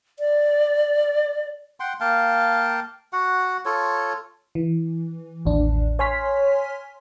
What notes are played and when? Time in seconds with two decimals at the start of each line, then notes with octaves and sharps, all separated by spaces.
0.19 D5
1.80 F#5 G5 C6
2.00 A#3 F5 G5 A5
3.13 F#4 F#5
3.65 F4 A4 C#5
4.55 E3
5.45 A1 D#2 D4
5.99 C#5 G#5 C6 F6 B6